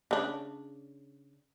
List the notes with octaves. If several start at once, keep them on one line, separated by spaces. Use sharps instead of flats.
C#3 D4